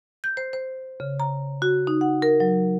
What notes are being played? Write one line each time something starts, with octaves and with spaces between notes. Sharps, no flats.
G6
C5
C5
C#3
A#5
F#4
D#4
F#5
A#4
F#3